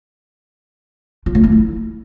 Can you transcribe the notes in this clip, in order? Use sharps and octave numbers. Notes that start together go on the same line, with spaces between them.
F4
A3
D4
E4